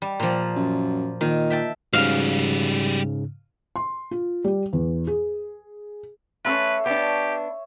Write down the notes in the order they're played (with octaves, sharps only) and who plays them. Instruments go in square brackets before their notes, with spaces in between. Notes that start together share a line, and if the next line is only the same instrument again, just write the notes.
[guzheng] G3
A#2 F3
[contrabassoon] F#2
[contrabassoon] A#2 [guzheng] D#3
[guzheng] E5 G5 A5
[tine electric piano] G#2 C#3 [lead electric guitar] G3 F#4 [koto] F5
[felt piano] C6
F4
G3
E2
G#4
[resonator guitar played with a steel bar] A3 C4 C#4 [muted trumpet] B4 [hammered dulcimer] C#5 E5 C6
[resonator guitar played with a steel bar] B3 D4 [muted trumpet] G4